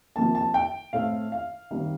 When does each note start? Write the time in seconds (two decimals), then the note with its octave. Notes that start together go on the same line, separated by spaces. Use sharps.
0.16 C3 F3 A#3 A5
0.35 A5
0.54 G5
0.93 A2 A3 C4 F5
1.32 F5
1.71 D#3 G3 C4